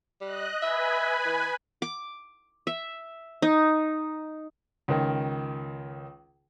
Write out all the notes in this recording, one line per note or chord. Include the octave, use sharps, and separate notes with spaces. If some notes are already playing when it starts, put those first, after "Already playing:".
G3 D#5 F#6
B4 E5 G#5 B5
E3
D6
E5
D#4
C#2 D#3